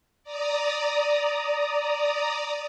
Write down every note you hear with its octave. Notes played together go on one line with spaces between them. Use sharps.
D5 A#5 D#6